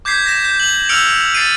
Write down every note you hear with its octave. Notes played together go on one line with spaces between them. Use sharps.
D6 G6 G#6 B6 C7
A#6 B6 E7
G6
F#7
E6 F6 G6 C#7 D7 F7
A6 C7 D7 D#7